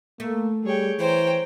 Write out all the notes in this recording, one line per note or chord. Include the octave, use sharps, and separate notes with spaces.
A3 A#3
G3 G#4 C#5 G5
E3 C5 C#5 G5 A#5